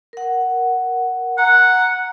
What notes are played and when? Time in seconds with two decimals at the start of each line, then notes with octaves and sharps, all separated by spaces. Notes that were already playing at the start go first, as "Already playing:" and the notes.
0.13 A#4 F#5
1.38 F#5 A#5